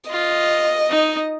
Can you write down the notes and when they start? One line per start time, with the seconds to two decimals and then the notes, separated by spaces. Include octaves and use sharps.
0.10 F4 D#5
0.90 D#4